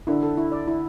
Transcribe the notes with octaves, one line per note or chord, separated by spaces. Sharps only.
D3 E4
A4
E4
D5
E4